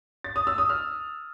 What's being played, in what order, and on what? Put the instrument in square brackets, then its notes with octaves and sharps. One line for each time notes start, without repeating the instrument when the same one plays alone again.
[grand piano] A6
D#6
E6
D#6
F6